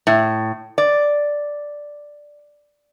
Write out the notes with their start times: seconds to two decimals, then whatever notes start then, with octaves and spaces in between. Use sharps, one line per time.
0.07 A2
0.78 D5